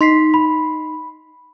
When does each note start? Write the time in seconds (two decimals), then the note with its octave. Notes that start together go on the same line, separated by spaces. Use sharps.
0.01 D#4 C6 B6 C7
0.34 B5